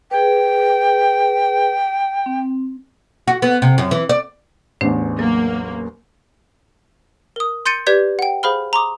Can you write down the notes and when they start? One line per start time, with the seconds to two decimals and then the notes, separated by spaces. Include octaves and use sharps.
0.11 G#4 B4 G5
2.26 C4
3.28 F#4
3.42 B3
3.62 C3
3.78 F#2
3.91 E3
4.09 D5
4.81 A1 E2 A3 D4 C5
5.19 F#3 A#3
7.36 A#4 D#6
7.66 C6 G6 A6 C#7 D#7
7.87 G4 B4 D5 G6 G#6 B6
8.19 F#5 G5
8.43 G#4 C5 F5 B5 F6 G7
8.73 A#5 C6 D6 D#6